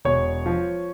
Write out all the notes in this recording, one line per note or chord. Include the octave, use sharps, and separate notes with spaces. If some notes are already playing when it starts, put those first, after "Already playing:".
E1 C#5
F3